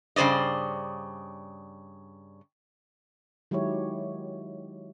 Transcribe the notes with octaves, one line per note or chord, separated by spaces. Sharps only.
G2 C#3 C5 D5 D#5
D#3 F#3 G#3 E4 G4 C#5